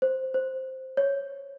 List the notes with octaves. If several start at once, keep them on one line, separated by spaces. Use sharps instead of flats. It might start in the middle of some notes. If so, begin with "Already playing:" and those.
C5
C5
C#5